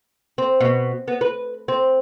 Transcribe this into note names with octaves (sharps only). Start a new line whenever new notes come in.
C4
B2
B3
B4
C4